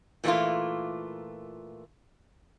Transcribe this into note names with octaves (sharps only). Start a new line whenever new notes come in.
A#2 E3 G3 A3 A#3 F4